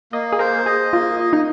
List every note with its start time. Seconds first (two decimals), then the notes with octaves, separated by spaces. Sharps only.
0.12 A#3 D#5
0.32 G#4
0.39 A#4 C5
0.66 G#4 D#5
0.93 A#3 F4
1.20 D#5
1.33 D#4